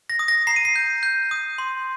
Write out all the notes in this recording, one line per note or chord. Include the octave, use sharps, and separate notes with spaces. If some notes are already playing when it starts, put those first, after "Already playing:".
A#6
D#6
A#6
A#5 C7
D#7
C7
G6
G6
D#6
C6